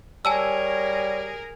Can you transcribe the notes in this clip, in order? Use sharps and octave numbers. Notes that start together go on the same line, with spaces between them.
G3 G#4 A#4 C#5 G#5 A5 E6